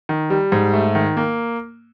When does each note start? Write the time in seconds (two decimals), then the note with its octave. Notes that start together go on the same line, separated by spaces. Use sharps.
0.09 D#3
0.30 G3
0.52 G#2
0.73 A3
0.95 D#3
1.17 A#3